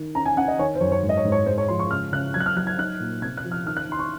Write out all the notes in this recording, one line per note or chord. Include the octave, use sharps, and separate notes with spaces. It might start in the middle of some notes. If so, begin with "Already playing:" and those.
Already playing: D#3
C#4 A#5
G#5
C#4 F#5
D#5
D#3 C#5
C5
F#2 C#5
C#5
G#2
D#5
C#5
G#2
C#5
G#3 C5
C#5
F3 C6
C#6
C#3 F6
C#3 F#6
F#3 G#6
F#6
F6
F#3 F#6
G#6
D#4 F#6
A#2
C3 G#6
F#6
F3
F6
D#3 F6
F#6
D#3 C6
C#6